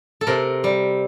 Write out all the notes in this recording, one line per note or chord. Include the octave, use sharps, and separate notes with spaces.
A4
C3 A#4
G3